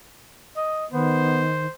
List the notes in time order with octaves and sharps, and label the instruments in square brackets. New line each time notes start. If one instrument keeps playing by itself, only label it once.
[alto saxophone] D#5
[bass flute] D#3 [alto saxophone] B3 [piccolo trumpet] C5